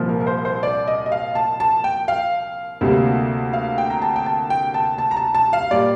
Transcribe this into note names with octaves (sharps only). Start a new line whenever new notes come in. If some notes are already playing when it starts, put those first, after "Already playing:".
Already playing: C2 A#2 F3
A#4
A#4
C5
C5
D5
D#5
D#5
F5
A5
A5
G5
F5
D2 C3 G3 A#3
F5
G5
A#5
A5
G5
A5
G5
A5
A5
A#5
A5
A5
F5
A#2 G3 D5